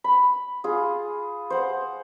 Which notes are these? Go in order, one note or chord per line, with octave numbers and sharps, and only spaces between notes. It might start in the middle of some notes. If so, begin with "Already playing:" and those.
B5
F4 G#4
C5 F#5